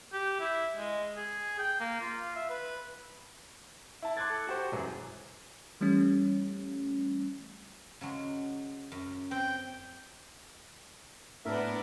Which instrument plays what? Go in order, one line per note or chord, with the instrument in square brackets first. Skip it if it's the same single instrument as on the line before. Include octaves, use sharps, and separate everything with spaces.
[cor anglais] G4
E4
G#3
G#4
G5
A#3
F4
E5
B4
[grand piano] E4 A5
C6 D6 F#6 G#6 A6
A4
F#4 G4 C5
E1 F#2 E3 G#5
[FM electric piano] E3 G3 A3 C#4
[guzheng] C#3 F#3 G#3
F#2
[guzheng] C4 [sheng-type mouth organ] G5
[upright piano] A2 [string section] B3 D4 [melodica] A#4 E5